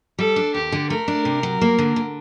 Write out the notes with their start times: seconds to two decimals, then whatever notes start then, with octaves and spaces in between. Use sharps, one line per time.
0.19 G3 A4
0.36 D4
0.54 D#2 G4
0.72 D3
0.90 A3 A#4
1.08 D4
1.25 C3
1.43 F#3
1.61 A#3
1.79 D3
1.96 D3